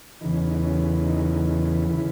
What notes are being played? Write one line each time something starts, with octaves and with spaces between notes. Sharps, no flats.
E2 C#3 E3 D#4
C#4
D#4
C#4
D#4
C#3 E3 E4